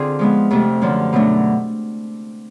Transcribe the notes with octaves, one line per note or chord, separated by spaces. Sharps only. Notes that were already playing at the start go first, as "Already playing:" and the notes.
Already playing: D3 C4 F4 G#4
F3 G#3 B3
F2 C3 F3 A3
F#2 D3 F3
B2 F#3 A3 D4